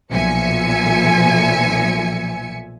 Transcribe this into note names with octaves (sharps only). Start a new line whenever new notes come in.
B1 A#2 F3 E5 G#5 C#7